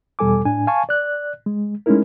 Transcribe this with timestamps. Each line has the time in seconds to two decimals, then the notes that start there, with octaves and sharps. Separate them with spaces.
0.19 E2 B2 G3 A4 G#5 D6
0.45 A2 D4 G#5
0.67 F5 G#5 A5 C#6
0.89 D5 F#6
1.46 G#3
1.86 G#3 A3 C#4 D#4 E4 A#4